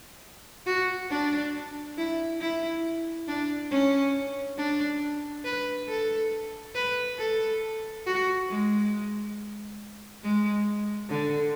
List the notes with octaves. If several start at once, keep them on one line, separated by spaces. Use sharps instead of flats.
F#4
D4
E4
E4
D4
C#4
D4
B4
A4
B4
A4
F#4
G#3
G#3
D3